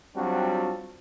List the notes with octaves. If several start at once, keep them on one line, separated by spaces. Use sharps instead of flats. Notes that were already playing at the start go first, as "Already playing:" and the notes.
F#3 G3 C4 D4 F4 F#4